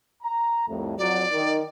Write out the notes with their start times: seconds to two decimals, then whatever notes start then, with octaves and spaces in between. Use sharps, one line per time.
0.23 A#5
0.68 C2 F2 A2
0.99 F2 F#3 D5
1.31 D#3